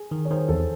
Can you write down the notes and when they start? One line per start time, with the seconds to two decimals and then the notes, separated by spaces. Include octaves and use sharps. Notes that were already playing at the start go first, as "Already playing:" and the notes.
Already playing: G#4
0.11 D#3
0.25 C#5
0.30 D#3 C5
0.49 E2 A4